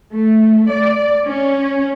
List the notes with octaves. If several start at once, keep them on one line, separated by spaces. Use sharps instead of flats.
A3
D5
C#4